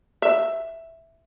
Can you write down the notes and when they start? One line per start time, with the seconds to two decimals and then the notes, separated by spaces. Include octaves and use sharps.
0.22 E5